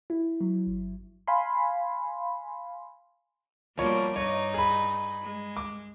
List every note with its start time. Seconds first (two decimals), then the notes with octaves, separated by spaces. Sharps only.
0.10 E4
0.41 F#3
0.67 G1
1.27 F5 G#5 B5 C6
3.77 B2 F3 G3 A#3 C#5
4.16 G2 D#4 C#5
4.54 G#4 B5
5.22 G#3
5.57 D6